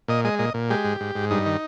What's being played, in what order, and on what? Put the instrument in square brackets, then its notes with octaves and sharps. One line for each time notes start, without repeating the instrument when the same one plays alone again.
[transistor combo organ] A#2 D#5
G#3 D#5
A#2 D#5
A#2
G#3 G4
G#2
G#2
G#2
G2 D#4
D#3